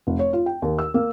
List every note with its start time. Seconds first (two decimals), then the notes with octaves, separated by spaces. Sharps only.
0.07 F1
0.19 C#5
0.33 F4
0.46 G5
0.62 D#2
0.79 E6
0.94 A#3